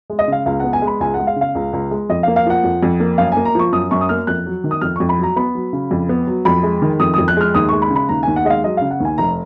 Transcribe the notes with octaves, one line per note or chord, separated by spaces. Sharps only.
G#3
D#5
C#3 F5
C#2 F5
B3 F#5
G#5
G#3
B5
C#2 G#5
F#5
G#3
F5
C#3
F5
C#2
C#2
G#3
F2 D#5
F5
A#3
F5
F3 F#5
F2
F2
A#3
F#2 F5
G#5
A#3
A#5
F3 C#6
F#2 D#6
F#2 C#6
D#6
A#3 F6
F2 F#6
F#3
D#3
D#6
F2 F6
F2 C#6
B5
F#3
A#5
B3 B5
F#3
C#3
F2
B3
F#3
F2 B5
G#3
D#3
F2 D#6
F2 D#6
F#6
G#3 F6
D#2 D#6
G#3 C#6
B5
C#3
B5
D#2 A#5
D#2 G#5
F#5
G#3 D#5
F5
F#3 D#5
C#3 F5
F#5
D#2 G#5
F1 A#5